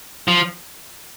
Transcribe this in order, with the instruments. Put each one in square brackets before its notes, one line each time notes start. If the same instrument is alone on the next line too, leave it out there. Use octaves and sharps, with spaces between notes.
[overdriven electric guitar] F3